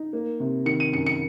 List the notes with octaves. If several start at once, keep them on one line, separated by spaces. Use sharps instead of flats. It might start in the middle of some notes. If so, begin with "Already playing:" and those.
Already playing: D#4
A#3
C3
D#3 C#7
D#7
F#2 C#7
C#7